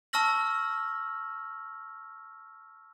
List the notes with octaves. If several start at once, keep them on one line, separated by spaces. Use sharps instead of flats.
A5 C#6 E6 F6 A#6 F#7